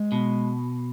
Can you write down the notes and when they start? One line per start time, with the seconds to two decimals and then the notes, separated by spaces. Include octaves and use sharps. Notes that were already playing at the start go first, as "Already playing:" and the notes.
Already playing: G#3
0.12 B2